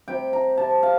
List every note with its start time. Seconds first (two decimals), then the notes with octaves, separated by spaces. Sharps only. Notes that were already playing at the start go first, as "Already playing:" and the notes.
0.08 C3 G3 G5
0.33 A#5
0.58 C3 G3 A5
0.83 F5